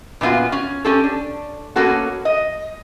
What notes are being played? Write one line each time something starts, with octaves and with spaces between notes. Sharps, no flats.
A#2 B3 D#4 F4 F#4
C#4
C#4 G4 A4
D4
B2 A#3 C#4 F#4 A4
D#5